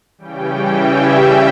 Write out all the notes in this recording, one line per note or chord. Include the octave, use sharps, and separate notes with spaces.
C#3 E3 G3 C#4 G5
E5